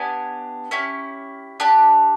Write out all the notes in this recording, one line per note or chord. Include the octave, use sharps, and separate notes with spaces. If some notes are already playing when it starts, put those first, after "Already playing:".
Already playing: B3 D4 G4 G#5
C#4 E4 G4
D4 G4 A5